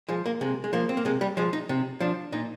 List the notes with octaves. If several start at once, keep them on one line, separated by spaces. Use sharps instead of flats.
F3 G#3
A#3
C3 G#3
G#3
F3 A#3
C4
A#3
C3 G#3
G3
F3 G#3
D#4
C3
F3 D4
A#2 D#4